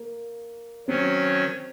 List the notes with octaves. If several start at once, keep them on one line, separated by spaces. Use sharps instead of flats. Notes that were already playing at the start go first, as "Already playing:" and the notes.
Already playing: A#3
D#3 F#3 C4 C#4 F#4 C#5